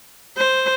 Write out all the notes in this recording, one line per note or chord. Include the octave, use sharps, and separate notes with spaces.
C5